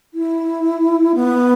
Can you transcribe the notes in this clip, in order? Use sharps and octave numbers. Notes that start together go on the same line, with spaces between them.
E4
B3